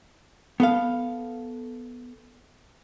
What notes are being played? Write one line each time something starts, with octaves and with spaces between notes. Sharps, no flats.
B3 A4 F5